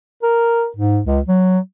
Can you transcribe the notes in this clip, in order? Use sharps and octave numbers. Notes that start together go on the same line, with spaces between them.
A#4
G#2
C#2
F#3